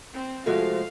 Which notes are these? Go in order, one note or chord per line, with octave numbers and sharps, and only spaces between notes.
C4
C3 F3 G#3 A3 F#4 A4 F5